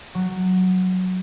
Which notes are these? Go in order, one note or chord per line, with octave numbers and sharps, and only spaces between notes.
F#3